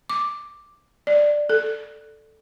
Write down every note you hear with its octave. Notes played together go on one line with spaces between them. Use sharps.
D6
D5
A4